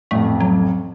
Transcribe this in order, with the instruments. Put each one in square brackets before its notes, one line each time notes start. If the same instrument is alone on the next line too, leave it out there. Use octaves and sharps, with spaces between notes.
[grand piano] A1 F2 [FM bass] A3
[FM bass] F#3